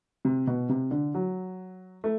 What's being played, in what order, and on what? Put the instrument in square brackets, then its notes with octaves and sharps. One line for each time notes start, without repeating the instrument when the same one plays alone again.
[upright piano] C3
B2
C3
D3
F#3
A3